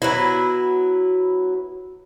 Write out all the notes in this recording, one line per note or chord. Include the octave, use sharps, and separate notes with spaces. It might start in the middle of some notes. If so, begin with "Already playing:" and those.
F#3 B3 E4